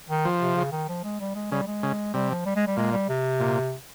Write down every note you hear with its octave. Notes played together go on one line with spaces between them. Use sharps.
D#3
F3
C3
C#3
D#3
F3
G#3
G3
G#3
C#3 G3
G#3
C#3
C3 G3
F3
G3
G#3
G3
A#2 G#3
G3
C3
A#2